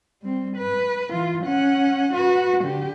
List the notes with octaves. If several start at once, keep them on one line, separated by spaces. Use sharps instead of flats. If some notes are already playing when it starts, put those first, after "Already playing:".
G3 C4
B4
E3 F4
C#4 F#5
F#4 B4
D3 G4